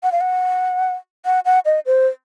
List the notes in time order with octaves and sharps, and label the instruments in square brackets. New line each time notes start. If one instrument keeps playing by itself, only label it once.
[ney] F#5
F5
F#5
F#5
F#5
D#5
C5